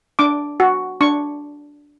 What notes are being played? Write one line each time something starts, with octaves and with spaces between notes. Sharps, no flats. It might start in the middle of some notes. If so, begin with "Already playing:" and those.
D4 D6
F#4
D4 C#6